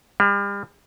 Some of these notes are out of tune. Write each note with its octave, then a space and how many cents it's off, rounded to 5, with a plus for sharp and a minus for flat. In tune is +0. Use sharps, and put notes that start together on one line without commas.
G3 +40